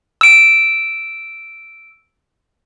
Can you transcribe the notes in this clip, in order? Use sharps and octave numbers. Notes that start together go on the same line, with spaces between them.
E6 D7